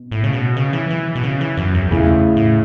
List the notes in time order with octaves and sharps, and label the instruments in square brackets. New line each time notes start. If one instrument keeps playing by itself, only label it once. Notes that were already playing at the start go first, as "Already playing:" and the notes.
Already playing: [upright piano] B2
[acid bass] A2
C#3
B2
C#3
E3
E3
B2
C#3
E3
F#2
E2
[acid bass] E2 [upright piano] C#3 A3 E4
[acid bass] A2